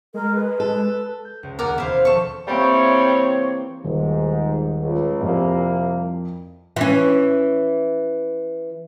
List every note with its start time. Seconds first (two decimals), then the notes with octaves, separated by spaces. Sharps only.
0.14 G#3 A#4
0.35 B4
0.60 A4
1.25 G6
1.43 C#2
1.59 D#2 A#4 D5 F#5 D#6 G#6
1.78 E1 E4 C5 F5
2.05 D#2 F3 A4 C#6
2.48 C3 E3 G3 A#3 C4 C#5
3.84 D#1 G#2
4.81 C#2
5.21 C2 F2 C3 A#3
6.76 E3 C#4